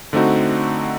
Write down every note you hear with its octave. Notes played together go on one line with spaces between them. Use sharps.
D3 A3 C4 D#4 F#4